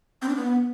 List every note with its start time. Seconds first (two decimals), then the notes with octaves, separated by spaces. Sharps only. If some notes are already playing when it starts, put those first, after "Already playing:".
0.22 C4
0.29 D4
0.36 B3